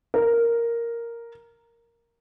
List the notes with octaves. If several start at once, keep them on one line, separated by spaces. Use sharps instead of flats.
A#4